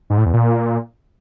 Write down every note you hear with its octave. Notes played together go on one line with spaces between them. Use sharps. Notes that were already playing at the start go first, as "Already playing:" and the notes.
G#2
A2
E2
A#2